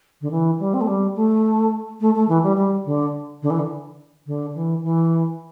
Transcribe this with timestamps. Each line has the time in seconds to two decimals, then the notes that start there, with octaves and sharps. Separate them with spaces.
0.21 D3
0.31 E3
0.59 G3
0.74 C4
0.81 A3
0.87 G3
1.15 A3
2.01 A3
2.15 A3
2.28 E3
2.43 G3
2.57 G3
2.85 D3
3.42 D3
3.50 E3
3.59 D3
4.26 D3
4.55 E3
4.83 E3